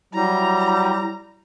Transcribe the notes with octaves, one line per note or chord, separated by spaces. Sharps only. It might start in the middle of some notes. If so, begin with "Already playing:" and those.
F#3 G3 E4 A#5